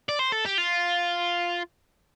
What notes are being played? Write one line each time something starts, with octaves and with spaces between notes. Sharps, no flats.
D5
C5
A4
G4
F4